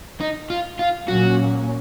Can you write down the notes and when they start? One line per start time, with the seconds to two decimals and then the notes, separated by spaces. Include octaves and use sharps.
0.21 D#4
0.50 F4
0.79 F4
1.08 A#2 F#3 A#3 C#4 F#4